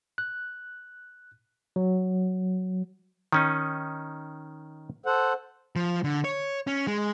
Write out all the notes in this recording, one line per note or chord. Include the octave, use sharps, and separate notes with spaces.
F#6
F#3
D#3 C#4 D#4
A4 C5 F#5
F3
D3
C#5
C#4
G#3